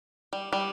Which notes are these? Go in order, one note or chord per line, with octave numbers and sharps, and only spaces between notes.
G3
G3